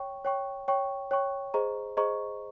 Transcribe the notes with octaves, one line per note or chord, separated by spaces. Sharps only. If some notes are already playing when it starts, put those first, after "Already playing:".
Already playing: C#5 G5 C#6
C#5 G5 C#6
C#5 G5 C#6
C#5 G5 C#6
G#4 C5 D#5 A#5 C#6
G#4 C5 D#5 A#5 C#6